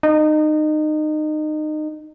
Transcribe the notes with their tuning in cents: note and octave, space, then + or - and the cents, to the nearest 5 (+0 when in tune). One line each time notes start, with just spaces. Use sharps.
D#4 -25